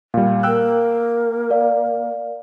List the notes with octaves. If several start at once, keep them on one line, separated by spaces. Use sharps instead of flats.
A#2 G3 F5
A#3 G5 E6 F#6
A#4 D5 F5